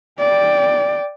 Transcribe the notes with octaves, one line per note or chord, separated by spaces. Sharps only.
D5 G5